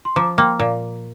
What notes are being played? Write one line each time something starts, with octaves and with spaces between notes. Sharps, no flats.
C6
F3 A#5 D6
A#3 G5 C6
A#2 F5 A#5